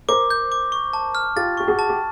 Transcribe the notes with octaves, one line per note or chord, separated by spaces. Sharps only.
A#4 C5 D6
G6
D6
C#6
A5
F6
F4 G4 A6
G4 C#6
F#4 G#4
A5
G4